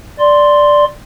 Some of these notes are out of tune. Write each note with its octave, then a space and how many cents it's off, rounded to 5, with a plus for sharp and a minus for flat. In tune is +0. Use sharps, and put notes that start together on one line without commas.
D5 +0 C6 +0